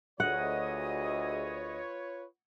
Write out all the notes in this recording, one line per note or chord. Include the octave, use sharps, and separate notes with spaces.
D2 F4 G#4 B4 C#5 D#5 F#5